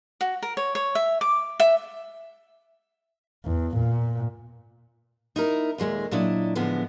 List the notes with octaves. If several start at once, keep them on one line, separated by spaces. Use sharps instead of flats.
F#4
A#4
C#5
C#5
E5
D6
E5
E2
A#2
D#4 E4 A#4
D#2 A#2 G#3 A3
A#2 F#3 D4 E4 D#5
A2 D3 F3 G#3 B3